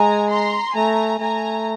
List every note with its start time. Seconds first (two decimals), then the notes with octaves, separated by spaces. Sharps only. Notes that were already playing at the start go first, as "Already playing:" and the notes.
Already playing: G#3 G#5 A#5
0.30 A#5 C6
0.75 A3 G#5 A#5
1.20 A3 G#5 A#5